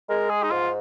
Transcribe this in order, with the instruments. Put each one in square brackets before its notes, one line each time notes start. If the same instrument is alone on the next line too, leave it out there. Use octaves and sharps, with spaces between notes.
[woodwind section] G#3 [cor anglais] A#4
[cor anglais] G#4
D#4
[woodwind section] G#2 [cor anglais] F4